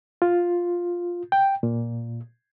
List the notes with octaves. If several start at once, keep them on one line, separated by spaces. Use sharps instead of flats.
F4
G5
A#2